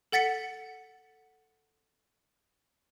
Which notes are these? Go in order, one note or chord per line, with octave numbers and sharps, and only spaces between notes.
A4 F#5 A6 B6 C#7